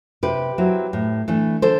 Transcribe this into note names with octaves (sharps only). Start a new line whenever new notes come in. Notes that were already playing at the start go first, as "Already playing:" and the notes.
C3 G4 B4
F#3 C4 E4
A2
E3 A3 D4
D3 A4 C5